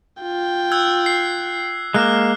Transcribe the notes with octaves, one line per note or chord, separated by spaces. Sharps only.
F4 G5
E6 F#6 G#6
C7
G#3 A#3 D6 F6 F#6